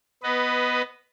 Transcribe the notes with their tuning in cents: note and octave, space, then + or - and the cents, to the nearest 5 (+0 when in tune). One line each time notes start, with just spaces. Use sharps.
B3 +0 B4 +15 D#5 +0